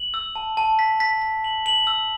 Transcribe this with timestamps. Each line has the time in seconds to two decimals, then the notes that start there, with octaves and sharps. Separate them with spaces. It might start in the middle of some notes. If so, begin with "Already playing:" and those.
Already playing: F#7
0.14 E6
0.36 A5
0.57 A5
0.79 B6
1.00 B6
1.22 B6
1.44 F#7
1.66 F#7
1.87 E6